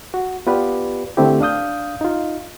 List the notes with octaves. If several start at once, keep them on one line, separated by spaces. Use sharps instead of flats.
F#4
B3 F4 G4 B4 D5
D3 A3 C4 E4 G4
D4 F5 D#6 G6
D#4 F4